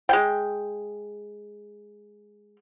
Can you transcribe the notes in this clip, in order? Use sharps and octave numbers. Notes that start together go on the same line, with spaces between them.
G#3 G5